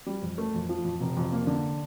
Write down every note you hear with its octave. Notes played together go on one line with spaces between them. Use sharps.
G3
F2
A3
F2
F3
F2
F1
F2
A#3
D3